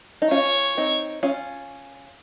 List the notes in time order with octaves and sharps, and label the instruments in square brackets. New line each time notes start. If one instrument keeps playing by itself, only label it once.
[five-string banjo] D#4
[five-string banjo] C#4 F4 [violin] C#5
[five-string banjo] C4 D#4
C#4 F4